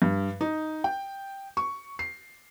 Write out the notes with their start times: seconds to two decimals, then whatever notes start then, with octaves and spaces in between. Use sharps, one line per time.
0.02 G2
0.41 D#4
0.84 G5
1.57 C#6
1.99 C7